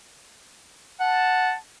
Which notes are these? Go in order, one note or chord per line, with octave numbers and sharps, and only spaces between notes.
F#5 A5